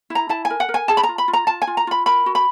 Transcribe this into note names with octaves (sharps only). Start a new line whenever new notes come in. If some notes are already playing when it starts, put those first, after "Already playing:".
E4
A#5
E4 A5
G#5
A#4
F#5
A#4
G#5
G#4 A5
B5
A#5
F4
B5
F4
A#5
F4 A5
G#5
F4
A#5
F4 B5
A#4 B5
F#4
B5